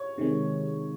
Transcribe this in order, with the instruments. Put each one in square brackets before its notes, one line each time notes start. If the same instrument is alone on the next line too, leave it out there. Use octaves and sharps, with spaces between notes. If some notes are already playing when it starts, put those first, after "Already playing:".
Already playing: [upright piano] C#5
[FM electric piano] C3 D#3 G#3